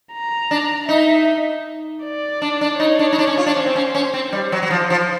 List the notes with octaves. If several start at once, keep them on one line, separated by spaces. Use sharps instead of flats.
A#5
D4
D#4 E5
D5
D4
D4
D#4 C#5
D4
D#4
D4
C#4
F4
D4
C#4 C5
C4
C#4
C#4
C4
G3 C5
F#3
F#3
F3
F3